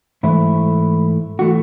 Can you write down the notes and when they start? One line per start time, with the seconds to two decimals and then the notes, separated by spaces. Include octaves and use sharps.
0.23 G#2 E3 A3 E4
1.39 E3 A3 F#4